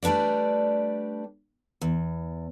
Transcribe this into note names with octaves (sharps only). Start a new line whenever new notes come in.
G3 A3 D4 B4 D5
E2